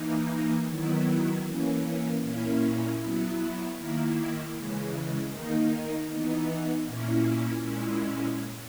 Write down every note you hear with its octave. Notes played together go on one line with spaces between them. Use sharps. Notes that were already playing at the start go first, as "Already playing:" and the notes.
Already playing: E3 A#3 D#4
D#3 F#3 B3 E4
E3 A#3 C#4
A#2 A#3 C#4 E4
F#3 B3 E4
D#3 A#3 E4
C#3 E3 G#3
D#3 A#3 D#4
E3 B3 D#4
A#2 A#3 C#4 E4
A#2 G#3 C#4 E4